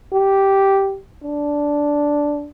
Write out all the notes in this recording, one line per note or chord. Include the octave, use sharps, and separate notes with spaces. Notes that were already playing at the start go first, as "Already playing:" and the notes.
G4
D4